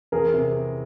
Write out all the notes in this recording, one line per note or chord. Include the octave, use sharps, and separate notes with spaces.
E2 G#4 A#4
C3